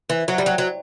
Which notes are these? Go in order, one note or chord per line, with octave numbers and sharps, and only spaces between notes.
E3
F#3
G3
F#3
F#3